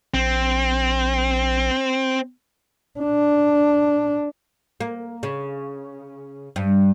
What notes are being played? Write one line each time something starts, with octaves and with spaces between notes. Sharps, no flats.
A#1 C4
D4
A#3
C#3
G2